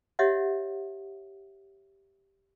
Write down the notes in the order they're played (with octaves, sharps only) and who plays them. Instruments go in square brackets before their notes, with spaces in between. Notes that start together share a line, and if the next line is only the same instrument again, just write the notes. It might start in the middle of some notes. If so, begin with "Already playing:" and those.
[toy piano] G4 C#5 D#5 E5 F#5